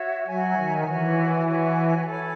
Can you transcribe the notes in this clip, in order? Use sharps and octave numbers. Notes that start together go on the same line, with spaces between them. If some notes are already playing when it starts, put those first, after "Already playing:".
Already playing: F#4 C#5 E5
F#3 F#4 C#5 E5 G#5
D#3
E3 F#4 C#5 E5 G#5
F#4 C#5 E5 G#5
A4 C#5 G#5 B5